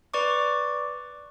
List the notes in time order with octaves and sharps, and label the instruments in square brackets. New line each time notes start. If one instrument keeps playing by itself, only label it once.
[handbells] B4 D5 C#6 D6